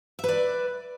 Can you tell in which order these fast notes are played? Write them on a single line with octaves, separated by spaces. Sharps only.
E5 B4 D5